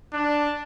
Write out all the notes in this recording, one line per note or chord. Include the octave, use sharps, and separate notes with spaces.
D4